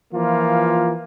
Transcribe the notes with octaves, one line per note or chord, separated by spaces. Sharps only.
E3 F3 A#3 F4